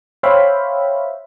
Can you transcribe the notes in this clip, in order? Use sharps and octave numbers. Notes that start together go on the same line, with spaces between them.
C5 C#5 E5 F5 G5 B5